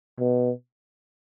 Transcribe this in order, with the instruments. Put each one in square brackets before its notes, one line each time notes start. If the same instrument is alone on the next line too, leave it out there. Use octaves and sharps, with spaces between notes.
[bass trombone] B2